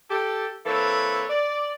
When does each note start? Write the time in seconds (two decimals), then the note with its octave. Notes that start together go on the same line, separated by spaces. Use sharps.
0.10 G4 A4
0.66 E3 A#3 C4 A4 B4 C#5
1.30 D5